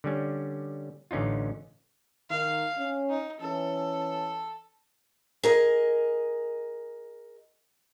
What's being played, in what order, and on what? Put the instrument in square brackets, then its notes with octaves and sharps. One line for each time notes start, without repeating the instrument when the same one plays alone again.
[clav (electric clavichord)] D3 G3 C#4
A1 D3 C#4 D#4 F4
[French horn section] D#3 [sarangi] F5
[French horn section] C#4
[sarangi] D#4
[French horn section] E3 C#4 [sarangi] A4
[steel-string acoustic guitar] G#4 A#4 D#5